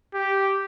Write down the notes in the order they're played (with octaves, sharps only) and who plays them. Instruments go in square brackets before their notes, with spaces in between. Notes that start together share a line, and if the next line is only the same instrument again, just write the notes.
[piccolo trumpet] G4